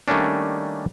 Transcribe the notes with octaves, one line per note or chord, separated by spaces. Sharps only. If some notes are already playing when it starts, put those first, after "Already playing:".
D#3 G3 A3 A#3 C#4 D4